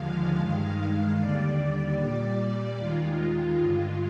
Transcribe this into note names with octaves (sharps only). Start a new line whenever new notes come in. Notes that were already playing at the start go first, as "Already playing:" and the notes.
Already playing: D#2 D3 F3 G#3 F5
G2 D#3 G#3
D#2 D3 G3 D5
A#2 G3
D#2 D#3 G#3 F4
G2 D3 G#3